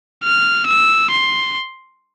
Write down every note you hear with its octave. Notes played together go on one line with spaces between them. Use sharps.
F6
E6
C6